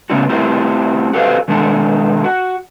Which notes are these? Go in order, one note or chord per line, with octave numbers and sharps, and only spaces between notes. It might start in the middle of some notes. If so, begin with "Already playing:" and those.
C#3 A3 B3 C#4 D#4 F#4
A3 C4 E4 F4 G4 C5
F#4 G4 A4 B4 C5 F5
B2 D#3 G#3 D4 A4
F#4